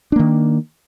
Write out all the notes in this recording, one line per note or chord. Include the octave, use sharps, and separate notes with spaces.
D#3 A#3 D4